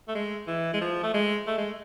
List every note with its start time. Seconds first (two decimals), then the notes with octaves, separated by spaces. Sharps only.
0.08 A3
0.15 G#3
0.47 E3
0.73 G#3
0.81 F3
1.03 A3
1.14 G#3
1.47 A3
1.58 G#3